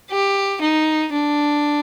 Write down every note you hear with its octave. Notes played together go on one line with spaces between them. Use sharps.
G4
D#4
D4